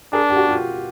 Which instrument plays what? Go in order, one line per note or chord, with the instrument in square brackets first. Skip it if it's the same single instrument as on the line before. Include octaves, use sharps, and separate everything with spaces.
[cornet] D4 [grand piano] G#4 A#4
[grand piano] G4
F#4
F4 G4